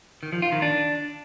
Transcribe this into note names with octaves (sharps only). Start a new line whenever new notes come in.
D#3
F3
F4
D#3
D4